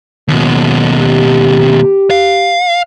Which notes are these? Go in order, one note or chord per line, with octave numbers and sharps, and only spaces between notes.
D#2 B2 F#3 G#3
G4
F5